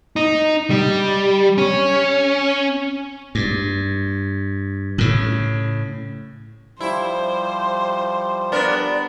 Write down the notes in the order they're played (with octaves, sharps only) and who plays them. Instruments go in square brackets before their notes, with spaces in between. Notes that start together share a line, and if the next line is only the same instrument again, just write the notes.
[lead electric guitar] D#4
G3
C#4
[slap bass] G2
A2 C#3
[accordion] F3 G3 [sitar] E4 [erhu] C5
[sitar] B3 D4 A#4 [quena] D5